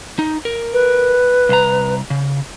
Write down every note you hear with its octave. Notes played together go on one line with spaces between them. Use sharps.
D#4
A#4
B4
C2 A#5
C#3